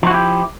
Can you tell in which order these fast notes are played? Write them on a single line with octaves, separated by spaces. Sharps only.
F3 F#4 E4 G4